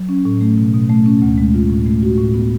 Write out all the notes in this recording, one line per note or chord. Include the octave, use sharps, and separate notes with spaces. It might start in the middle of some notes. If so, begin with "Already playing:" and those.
Already playing: F#3
C#4
A2
A3
B2
B2
A3
C#4
D2
G#3
F4
A2
A3
F#4
A2
B3